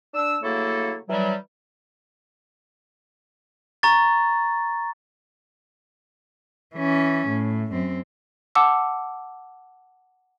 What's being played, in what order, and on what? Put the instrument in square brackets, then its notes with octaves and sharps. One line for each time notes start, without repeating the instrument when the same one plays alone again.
[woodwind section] D4 E6
C#3 F#3 A3 A#3 E4 A4
E3 F#3 G3
[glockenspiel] A#5 C#6 A6
[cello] E3 C#4
A2
F#2 C4
[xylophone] F#5 A5 D6 E6